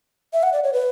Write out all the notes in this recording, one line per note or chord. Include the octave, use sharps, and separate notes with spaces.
E5
F#5
D5
C#5
B4